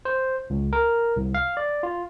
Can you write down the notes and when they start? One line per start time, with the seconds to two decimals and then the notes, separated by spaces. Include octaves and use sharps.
0.05 C5
0.50 C#2
0.73 A#4
1.16 C2
1.34 F5
1.57 D5
1.83 F4